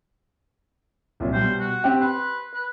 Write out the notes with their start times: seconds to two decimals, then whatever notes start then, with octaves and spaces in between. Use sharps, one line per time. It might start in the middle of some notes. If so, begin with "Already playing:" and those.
1.20 C2 A#2 F#3
1.33 B2 G3 C5
1.60 F#4
1.84 C4 G4
2.01 B4 C6
2.54 B4